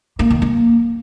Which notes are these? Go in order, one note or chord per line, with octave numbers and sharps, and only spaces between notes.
A#3
D#3
A#3